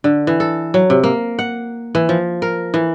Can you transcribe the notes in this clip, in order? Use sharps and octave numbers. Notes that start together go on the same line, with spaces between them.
D3
E3
A4
F#3
C3
A#3
F#5
E3
F3
A#4
E3